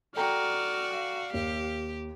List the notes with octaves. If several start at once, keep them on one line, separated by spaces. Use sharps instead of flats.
F#4 A4 D5 G5 A#5 F6
F5
D#2 G4